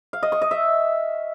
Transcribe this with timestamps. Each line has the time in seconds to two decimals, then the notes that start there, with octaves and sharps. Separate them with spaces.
0.13 F5
0.23 D#5
0.32 C#6
0.42 D#5
0.51 E5